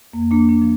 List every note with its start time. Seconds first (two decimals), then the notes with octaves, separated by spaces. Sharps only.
0.13 F2 A#3
0.31 A#3 D4
0.37 F3
0.49 A#3 D4
0.61 F3